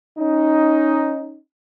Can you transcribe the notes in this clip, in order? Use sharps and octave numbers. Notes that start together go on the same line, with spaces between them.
C#4 D#4